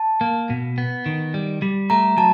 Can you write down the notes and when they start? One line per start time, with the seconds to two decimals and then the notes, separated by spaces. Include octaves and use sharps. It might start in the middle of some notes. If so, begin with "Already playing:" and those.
Already playing: A5
0.21 A#3
0.50 B2
0.78 B3
1.06 D#3
1.34 G3
1.62 G3
1.90 A3 A#5
2.17 F#3 A5